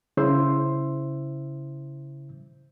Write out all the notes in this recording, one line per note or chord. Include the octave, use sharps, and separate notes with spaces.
C#3 E4 C5 E5 C6